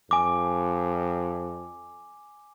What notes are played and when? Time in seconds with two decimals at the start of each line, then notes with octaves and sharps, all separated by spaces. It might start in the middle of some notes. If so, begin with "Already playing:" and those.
0.11 F2 G#5 D6